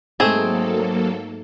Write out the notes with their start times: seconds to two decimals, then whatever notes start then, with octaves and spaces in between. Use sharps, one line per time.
0.20 G#2 F#3 A3 A#3 C4 G#4 A4